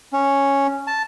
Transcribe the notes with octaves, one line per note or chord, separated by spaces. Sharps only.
C#4
A5